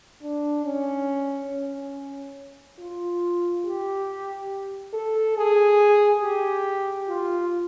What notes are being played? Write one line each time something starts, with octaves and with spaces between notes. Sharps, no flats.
D4
C#4
C#4
F4
G4
A4
G#4
G4
F4